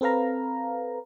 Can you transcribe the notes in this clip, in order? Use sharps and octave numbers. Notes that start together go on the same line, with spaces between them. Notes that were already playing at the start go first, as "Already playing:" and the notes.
C4 A4 B4 F5 A#5